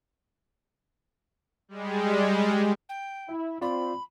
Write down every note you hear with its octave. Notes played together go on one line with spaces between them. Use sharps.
G3 G#3
G5
E4 E5
C4 F4 D5 B5